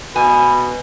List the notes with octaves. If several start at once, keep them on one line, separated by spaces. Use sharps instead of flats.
B2 G#5 B5